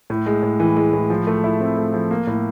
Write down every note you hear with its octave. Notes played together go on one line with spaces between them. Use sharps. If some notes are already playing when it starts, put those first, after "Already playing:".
A2
G#3
A2
E3
G#3
A2
F3
A3
E4
C4
A3
F3
A#3
A2